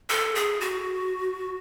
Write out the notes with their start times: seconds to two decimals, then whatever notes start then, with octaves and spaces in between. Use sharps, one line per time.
0.10 A4
0.35 G#4
0.60 F#4